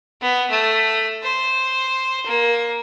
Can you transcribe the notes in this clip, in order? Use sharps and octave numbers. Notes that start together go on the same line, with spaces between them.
B3
A3
C5
A#3